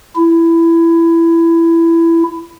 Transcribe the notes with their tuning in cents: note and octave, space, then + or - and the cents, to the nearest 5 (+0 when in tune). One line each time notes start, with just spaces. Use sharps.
E4 +15